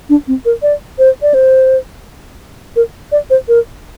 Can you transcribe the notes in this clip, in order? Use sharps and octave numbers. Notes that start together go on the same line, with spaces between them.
D4
C4
A#4
D5
C5
D5
C5
A#4
D5
C5
A#4